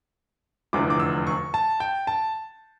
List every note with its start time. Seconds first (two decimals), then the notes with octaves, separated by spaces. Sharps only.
0.73 F1 E2 D3 F3 D6
0.90 D6
1.00 E6
1.27 C#6
1.54 A5
1.80 G5
2.07 A5